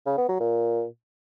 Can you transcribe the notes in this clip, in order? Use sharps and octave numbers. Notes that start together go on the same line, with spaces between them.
C#3
B3
F#3
A#2